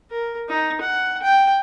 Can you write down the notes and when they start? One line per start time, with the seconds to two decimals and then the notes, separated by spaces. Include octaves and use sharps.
0.11 A#4
0.49 D#4
0.81 F#5
1.22 G5